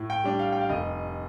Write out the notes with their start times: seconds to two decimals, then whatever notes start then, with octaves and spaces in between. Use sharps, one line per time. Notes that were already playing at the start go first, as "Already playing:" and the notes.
Already playing: A2
0.10 G5
0.24 G3 D4
0.39 F5
0.52 G5
0.61 F5
0.69 F1 D#5